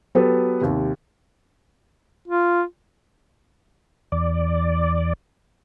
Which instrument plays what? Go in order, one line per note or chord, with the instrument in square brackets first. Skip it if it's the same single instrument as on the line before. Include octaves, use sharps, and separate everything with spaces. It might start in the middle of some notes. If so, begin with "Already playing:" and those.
[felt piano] F#3 B3 G4 A4 B4
D#2 C3
[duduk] F4
[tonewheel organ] E2 D5